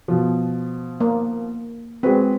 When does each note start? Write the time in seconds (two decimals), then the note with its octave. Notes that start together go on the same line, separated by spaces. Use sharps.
0.08 B2 F3
1.00 A#3
2.03 G#3 C4 F#4 B4